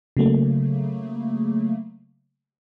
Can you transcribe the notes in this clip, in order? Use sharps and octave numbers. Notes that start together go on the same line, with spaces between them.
C#3 F#3 A3 A#3